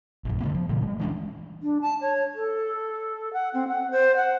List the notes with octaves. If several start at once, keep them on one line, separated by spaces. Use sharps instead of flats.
A#1 F#2
D3 F#3 A3 B3
F3
A#2 C#3 E3 G3
G3 G#3
E3 G#3 C#4 D4
D4
A5
C#5
A4
F#5
C4
F#5
C5
F#5